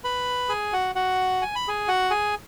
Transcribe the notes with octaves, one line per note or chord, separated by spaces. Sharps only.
B4 B5
G#4 G#5
F#4 F#5
F#4 F#5
G#5
B5
G#4 G#5
F#4 F#5
G#4 G#5